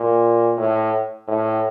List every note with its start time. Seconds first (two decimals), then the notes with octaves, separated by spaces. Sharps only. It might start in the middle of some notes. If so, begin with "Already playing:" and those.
Already playing: A#2
0.57 A2
1.28 A2